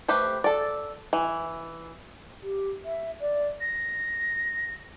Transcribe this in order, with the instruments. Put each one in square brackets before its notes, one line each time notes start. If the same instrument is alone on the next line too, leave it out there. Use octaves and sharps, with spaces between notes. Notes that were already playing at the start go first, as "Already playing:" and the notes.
[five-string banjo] A3 G4 B4 C5
A4 D5
E3
[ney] G4
E5
D5
[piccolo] A#6